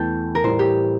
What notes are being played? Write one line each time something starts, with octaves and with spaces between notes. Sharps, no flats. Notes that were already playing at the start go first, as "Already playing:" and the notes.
Already playing: E2 E3 A3 G5 A5
A#4
A2 E3 G3 C5
G4